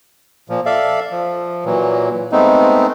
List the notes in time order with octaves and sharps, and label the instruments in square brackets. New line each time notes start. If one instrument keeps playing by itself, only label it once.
[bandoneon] A#2 F3
A4 D5 E5 F5
F3
A#2 E3 F#3
G#3 A3 B3 C4 D#4